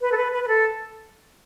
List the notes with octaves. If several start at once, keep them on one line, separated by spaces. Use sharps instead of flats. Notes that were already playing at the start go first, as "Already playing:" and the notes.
B4
A4
B4
B4
B4
A4